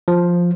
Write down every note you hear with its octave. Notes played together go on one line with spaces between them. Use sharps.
F3